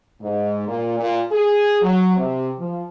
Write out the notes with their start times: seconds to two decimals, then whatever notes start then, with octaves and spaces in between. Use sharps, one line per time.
0.22 G#2
0.68 A#2
0.99 A#2
1.32 G#4
1.82 F#3
2.17 C3
2.58 F3